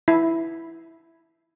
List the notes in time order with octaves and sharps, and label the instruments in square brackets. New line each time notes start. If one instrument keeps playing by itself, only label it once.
[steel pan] E4